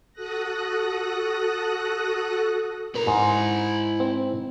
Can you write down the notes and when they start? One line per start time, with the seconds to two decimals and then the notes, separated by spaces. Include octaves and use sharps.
0.13 F#4 A4 D#6 F#6 A#6
2.95 E4 A#4 A#5
3.07 G#2
4.00 C4